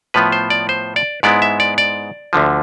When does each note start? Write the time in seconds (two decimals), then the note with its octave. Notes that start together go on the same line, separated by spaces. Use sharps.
0.14 A2 F3 B3 B4
0.32 C5
0.50 D5
0.69 C5
0.96 D5
1.23 G#2 G#3 B3 E4 D5
1.42 E5
1.60 D5
1.78 D5
2.33 D2 D3 F3